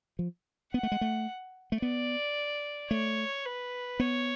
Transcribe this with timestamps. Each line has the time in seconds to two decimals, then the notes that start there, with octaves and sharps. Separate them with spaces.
0.19 F3
0.74 B3 F#5
0.83 A3
0.92 G#3
1.01 A3
1.72 A3
1.82 B3 D5
2.91 A3 C#5
3.46 B4
4.00 B3 C#5